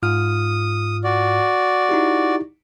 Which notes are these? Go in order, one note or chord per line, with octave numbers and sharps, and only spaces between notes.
G#2 F4 D#6 F6
F#4 D5
D#4 E4 G4